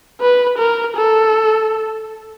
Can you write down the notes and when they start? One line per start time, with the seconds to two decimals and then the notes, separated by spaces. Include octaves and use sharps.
0.21 B4
0.59 A#4
0.96 A4